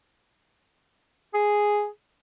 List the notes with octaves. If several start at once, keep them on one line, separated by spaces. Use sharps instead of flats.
G#4